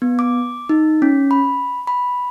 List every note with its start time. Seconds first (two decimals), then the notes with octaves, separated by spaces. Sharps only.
0.02 B3
0.19 D6
0.69 D#4
1.02 C#4
1.31 B5
1.87 B5